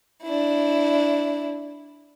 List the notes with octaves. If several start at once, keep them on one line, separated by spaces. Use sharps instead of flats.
D4 E4